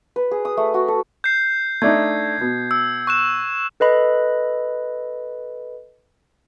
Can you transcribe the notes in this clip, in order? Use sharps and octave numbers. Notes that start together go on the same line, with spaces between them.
B4
G#4
D#6
A3
F#4
A4
G6 C7
A3 D4 D#4 G#6
B2
E6
C#6 F#6 E7
A4 B4 D#5 B5